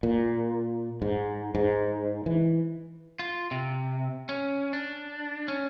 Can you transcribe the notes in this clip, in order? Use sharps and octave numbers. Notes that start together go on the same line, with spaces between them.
A#2
G#2
G#2
E3
F4
C3
C#4
D4
C#4